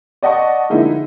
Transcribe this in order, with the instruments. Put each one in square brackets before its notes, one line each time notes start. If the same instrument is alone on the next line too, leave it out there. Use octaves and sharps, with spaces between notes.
[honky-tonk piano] D5 D#5 F#5 A5 C#6
D3 F3 G#3 A#3 D#4 E4